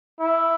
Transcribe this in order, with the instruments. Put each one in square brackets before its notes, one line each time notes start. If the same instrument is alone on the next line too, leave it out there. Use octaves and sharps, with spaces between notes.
[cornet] E4